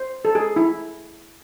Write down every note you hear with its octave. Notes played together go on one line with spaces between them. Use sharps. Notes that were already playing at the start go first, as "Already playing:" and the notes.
Already playing: C5
A4
G#4
E4